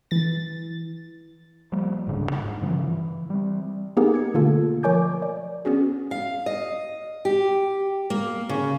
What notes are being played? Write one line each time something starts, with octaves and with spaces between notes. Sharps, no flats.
E3 A6
F3 G3 A#3
D1 G#2 C#3 D4
G#2
G2 C#3 E3 F3
E3
G3 C4
A#3 B3 D#4 G4 G#4 A#4
G#6 C#7
B2 D3 A3 A#3 F4 A4
F3 A#4 C#5 G#5 D6 G6
D5
B3 C#4 F#4 G#4
F5
D#5
G4
A#3
C#3